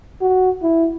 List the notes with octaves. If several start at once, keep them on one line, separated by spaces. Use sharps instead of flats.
F#4
E4